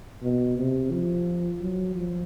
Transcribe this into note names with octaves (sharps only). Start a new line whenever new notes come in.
B2
C3
F3
F#3
F3